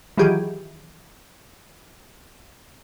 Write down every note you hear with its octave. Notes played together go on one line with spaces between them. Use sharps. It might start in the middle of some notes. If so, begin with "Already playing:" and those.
D#3 E3 F#3 F4 G4 G#4